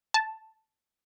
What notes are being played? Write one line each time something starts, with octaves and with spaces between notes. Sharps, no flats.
A5